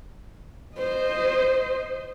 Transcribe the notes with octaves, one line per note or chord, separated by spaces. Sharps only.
C5 D#5